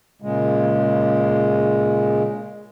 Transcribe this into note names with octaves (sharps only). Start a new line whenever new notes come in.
A#2 C#3 G#3